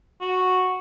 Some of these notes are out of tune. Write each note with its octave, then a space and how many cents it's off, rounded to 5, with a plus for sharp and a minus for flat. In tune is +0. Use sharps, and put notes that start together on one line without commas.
F#4 -5